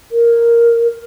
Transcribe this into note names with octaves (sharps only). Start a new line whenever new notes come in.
A#4